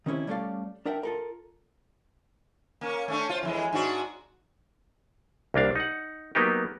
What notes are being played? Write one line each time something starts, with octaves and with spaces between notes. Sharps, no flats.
D#3 C4 C#4 E4 G4
G3 A3 C#4 A4 D5 F5
D4 A#4 E5 F#5 G5
F4 A4 A#4
A#3 C#4
A3 C#4 D4
F4 C5
F2 E3 G#3
G#2 D4 F#4
C2 A#3 D4 F5
D#4 F#5
F#3 A#3 B3 D#4 G4